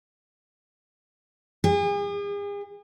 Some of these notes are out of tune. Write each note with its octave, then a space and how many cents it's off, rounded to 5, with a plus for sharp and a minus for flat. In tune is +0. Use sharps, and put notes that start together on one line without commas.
G#4 -40